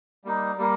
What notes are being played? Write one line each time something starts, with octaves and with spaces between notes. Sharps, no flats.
G3 A#3 D#4
G3 A#3